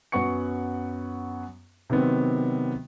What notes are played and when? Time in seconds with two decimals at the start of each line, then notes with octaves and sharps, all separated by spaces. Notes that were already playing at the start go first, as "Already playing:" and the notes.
0.12 F#2 F#3 B3 F#5 C#6 C#7
1.90 C3 D#3 F#3 B3 C4